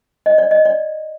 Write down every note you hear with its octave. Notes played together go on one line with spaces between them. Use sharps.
D#5
D5
D#5
D5